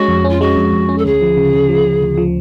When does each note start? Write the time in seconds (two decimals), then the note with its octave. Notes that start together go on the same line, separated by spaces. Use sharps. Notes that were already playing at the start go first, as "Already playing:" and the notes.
Already playing: G#3 C#4 F#4
0.08 F2
0.25 C#4 F4
0.41 G#3 F#4
0.57 F2
0.73 F2
0.89 C#4
0.98 A4
1.04 D2 G#4
1.21 F3
1.37 C#3
1.54 C#3
1.69 F3
1.85 C#3
2.02 D2
2.18 F3